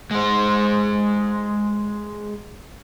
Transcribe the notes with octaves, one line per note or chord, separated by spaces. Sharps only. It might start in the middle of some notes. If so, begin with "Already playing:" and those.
G#3 C5